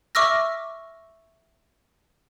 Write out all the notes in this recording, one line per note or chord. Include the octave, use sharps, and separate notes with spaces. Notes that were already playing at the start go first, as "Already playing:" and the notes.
E5 C#6 D6 E6 F6 A#6